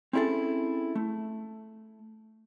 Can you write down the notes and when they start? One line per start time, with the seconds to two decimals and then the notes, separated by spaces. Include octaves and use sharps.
0.13 C4 C#4 E4 G#4 A4
0.95 A3